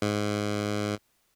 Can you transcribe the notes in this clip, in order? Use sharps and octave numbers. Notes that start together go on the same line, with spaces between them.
G#2